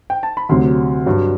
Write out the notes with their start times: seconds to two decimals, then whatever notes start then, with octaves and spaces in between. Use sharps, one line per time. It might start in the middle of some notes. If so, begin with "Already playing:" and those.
0.10 G5
0.23 A5
0.37 B5
0.49 D2 C3 F#3 C6
1.06 G2 F#3